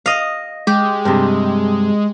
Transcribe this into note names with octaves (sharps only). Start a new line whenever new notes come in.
D#5 F5
G#3 G4
G2 C3